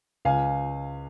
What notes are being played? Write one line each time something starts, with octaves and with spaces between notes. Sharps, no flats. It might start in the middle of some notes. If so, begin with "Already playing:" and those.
C#2 F5 G#5